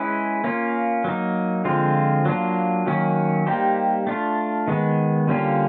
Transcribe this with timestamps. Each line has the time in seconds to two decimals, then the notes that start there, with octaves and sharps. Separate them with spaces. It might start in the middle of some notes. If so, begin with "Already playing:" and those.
Already playing: G#3 C#4 E4 G#4 B4
0.44 A#3 C#4 F4
1.04 F#3 A#3 D#4
1.65 D3 F3 G#3 C4 F4
2.25 F#3 A#3 D4 F4
2.86 D#3 F#3 A#3 C#4
3.47 G3 A#3 D#4 G4 C5
4.07 A3 D4 F4
4.68 D#3 G#3 B3
5.27 D3 G3 A#3 C#4 F4